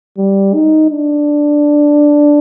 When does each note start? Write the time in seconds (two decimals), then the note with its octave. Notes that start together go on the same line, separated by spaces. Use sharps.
0.17 G3
0.54 D#4
0.91 D4